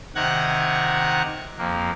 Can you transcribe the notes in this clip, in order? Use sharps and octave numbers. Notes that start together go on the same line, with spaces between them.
C3 D#3 F#5 A#5 F#6 G#6
F2 A#3